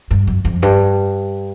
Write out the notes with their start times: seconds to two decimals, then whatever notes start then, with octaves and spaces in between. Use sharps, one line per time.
0.11 G2
0.27 F#2
0.45 F2
0.62 G2